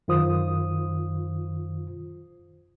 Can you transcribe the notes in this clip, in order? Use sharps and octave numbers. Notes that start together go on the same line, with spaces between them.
F#2 D#3 F4 C5 D#6